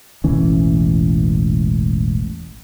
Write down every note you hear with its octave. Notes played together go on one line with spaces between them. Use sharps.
E1 A1 E3 C#4